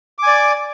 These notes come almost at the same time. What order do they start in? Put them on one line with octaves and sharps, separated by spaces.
D6 G#5 D5